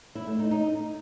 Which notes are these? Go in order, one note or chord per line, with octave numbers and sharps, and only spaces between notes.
E4
A3
D#4
D#4